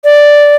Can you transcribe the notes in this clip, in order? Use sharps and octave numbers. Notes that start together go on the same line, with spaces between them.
D5